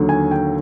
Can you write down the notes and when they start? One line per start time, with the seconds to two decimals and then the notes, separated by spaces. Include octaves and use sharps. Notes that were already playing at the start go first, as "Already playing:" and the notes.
Already playing: D#2 D3 F#3
0.09 G#5
0.31 G5